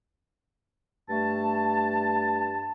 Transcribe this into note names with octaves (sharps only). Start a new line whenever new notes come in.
G2 A3 A5